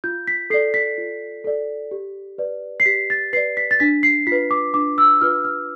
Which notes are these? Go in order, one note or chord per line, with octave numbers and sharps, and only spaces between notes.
F4 G6
B6
A4 D5 C7
B6
F4
A4 D5
G4
B4 D5
C7
G4 B6
A6
B4 D5 C7
B6
A6
D4 B6
C7
F4 B4 B6
D6
D4 D6
E6
F4 B4 F6
F6